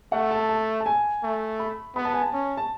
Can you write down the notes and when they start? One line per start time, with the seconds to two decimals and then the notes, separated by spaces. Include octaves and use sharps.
0.12 A3 F#5
0.31 A5
0.49 A5
0.80 A5
0.86 G#5
1.23 A3
1.59 B5
1.96 B3 B5
2.05 A5
2.14 G#5
2.21 A5
2.33 C#4
2.57 A5